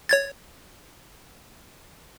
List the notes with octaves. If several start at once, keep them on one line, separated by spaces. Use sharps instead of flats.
C#5 G#6 A6